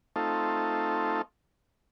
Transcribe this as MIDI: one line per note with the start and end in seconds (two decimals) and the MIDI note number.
0.16 1.22 57
0.16 1.22 60
0.16 1.22 63
0.16 1.22 65
0.16 1.22 69